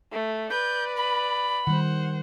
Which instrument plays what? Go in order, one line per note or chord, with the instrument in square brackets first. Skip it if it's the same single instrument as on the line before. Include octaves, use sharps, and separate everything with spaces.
[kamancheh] A3
[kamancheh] B4 D5 [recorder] G6
[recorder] B5
[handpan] D#3 G3 [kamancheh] C5 F#5